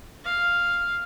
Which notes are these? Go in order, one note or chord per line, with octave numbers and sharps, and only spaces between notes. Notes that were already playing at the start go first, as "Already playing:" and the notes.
F5